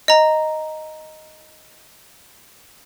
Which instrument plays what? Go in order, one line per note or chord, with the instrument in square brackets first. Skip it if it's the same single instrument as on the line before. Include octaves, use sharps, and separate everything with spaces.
[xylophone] D#5 A#5